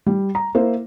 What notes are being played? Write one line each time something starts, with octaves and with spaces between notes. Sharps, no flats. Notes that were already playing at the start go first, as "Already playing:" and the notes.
G3
A#5
A#3 E4 C5